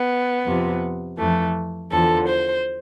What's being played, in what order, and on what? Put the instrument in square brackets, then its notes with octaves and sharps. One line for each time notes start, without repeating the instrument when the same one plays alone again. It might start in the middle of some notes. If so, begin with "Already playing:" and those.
Already playing: [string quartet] B3
F2 C3 F3
F2 E3 A3
E2 D3 F3 A4
C5